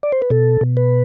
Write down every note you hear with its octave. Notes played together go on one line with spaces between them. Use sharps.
D5
C5
B4
B2 A4
B2
B4